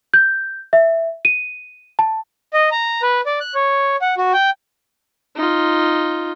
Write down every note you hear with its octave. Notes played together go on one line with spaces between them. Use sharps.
G6
E5
D#7
A5
D#5
A#5
B4
D5
F#6
C#5
F#5
F#4
G5
D#4 F4